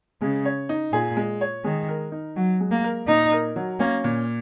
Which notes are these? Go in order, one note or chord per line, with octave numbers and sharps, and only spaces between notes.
C#3 G#3
C#5
D#4
A#2 G#4
G#3
C#5
D#3 G#3
A#4
D#4
F#3 F#4
G#3
A#3
A#4
A#2 D#4
A#4
F#3
A#3 C#4
A#2